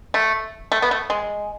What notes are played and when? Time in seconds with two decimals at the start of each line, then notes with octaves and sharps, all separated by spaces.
0.14 A3
0.72 A3
0.82 B3
0.91 A3
1.10 G#3